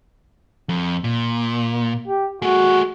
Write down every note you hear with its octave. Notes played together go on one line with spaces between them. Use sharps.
F2
A#2
G4
A3 F#4 G#4